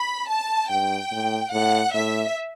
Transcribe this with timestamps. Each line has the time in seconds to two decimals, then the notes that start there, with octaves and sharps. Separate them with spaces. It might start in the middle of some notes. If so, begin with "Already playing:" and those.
Already playing: B5
0.29 A5
0.70 G2 G5
1.11 A2
1.53 A2 F#5
1.94 A2 E5